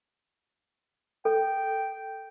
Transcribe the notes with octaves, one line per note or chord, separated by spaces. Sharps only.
A4 G5